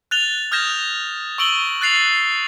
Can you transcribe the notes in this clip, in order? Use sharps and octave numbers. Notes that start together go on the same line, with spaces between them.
F#6 A6 F7 G7
D#6 F6 G6 G#6 A#6 E7
C#6 E6 D7 F#7 G7
F#6 A6 C7 F7